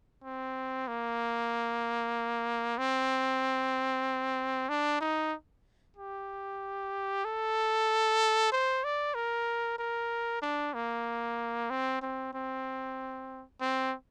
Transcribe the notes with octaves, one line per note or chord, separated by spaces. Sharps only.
C4
A#3
C4
D4
D#4
G4
A4
C5
D5
A#4
A#4
D4
A#3
C4
C4
C4
C4